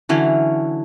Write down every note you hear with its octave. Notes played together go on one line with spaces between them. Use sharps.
D3 E3 F#3 C#4